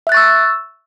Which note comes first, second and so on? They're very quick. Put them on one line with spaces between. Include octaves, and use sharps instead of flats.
E5 F#6 A6 C#6 E6